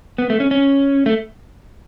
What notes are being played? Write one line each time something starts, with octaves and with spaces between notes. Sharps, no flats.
B3
A3
C#4
C#4
A3